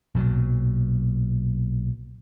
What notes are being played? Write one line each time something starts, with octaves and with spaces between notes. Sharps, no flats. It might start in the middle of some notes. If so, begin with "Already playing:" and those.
B1 A#2 C#3 F#3